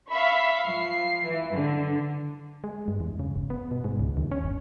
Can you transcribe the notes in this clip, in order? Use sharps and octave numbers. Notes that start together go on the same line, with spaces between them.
E5 F5 B5 C#6
F3 C7
E3
D3
G#3
G2
E2
C#3
G1
B3
B2
G#2
C#2
D#2
C#4
G1